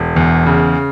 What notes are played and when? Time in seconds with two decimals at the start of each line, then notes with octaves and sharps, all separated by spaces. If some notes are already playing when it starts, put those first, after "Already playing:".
Already playing: E1
0.16 E2
0.46 C#3